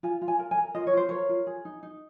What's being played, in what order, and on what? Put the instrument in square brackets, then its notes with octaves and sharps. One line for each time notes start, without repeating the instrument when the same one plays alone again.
[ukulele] F4 G#5
F4
G#5
A#4
G#5
A#4
F4 D#5
C#5
F4 C5
A#4 C#5
F4
G#4
D#4
D#4